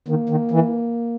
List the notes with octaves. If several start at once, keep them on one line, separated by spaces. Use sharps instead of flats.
D#3 A#3
D#3
E3